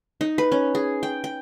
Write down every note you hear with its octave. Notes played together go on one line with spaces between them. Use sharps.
D#4
B4
C#4
G#4
G5
G5